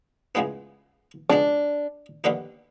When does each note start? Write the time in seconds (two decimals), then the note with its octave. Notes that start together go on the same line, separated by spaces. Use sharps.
0.35 C#2 C#3 E3 G#3 B3
1.29 C#2 B2 G#3 D4
2.24 D#2 D3 G3 B3 D#4